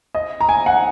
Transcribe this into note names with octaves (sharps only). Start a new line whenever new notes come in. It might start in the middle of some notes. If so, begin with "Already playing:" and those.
D#5
A#5
G#5
F#5